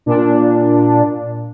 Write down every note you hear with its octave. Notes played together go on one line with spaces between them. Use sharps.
A#2 D4